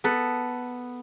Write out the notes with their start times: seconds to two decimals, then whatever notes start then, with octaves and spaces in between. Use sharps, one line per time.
0.04 B3 A4 B4